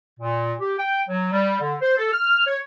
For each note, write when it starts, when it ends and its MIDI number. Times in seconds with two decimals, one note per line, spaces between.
0.20 0.53 46
0.60 0.74 67
0.79 1.00 79
1.09 1.32 54
1.33 1.58 55
1.61 1.75 50
1.81 1.94 72
1.97 2.10 69
2.13 2.42 89
2.47 2.59 73